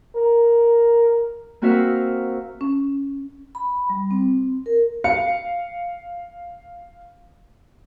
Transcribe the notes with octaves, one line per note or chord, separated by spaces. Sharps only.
A#4
A#3 C4 F#4 A#4 E5 F5
C#4
B5
G3
C4
A#4
F5 C#7